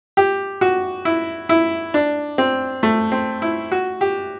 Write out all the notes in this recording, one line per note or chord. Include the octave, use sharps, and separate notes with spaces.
G4
F#4
E4
E4
D4
C4
A3
C4
E4
F#4
G4